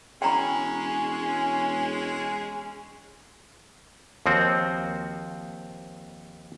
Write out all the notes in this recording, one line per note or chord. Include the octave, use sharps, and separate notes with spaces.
E1 G#3 C#4 G5 A#5 B5
D#2 F3 C4 F#4